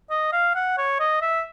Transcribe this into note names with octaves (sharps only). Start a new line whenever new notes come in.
D#5
F5
F#5
C#5
D#5
E5